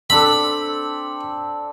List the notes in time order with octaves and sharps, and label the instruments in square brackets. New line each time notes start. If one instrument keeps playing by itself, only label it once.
[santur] C4 D4 A4 [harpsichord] B5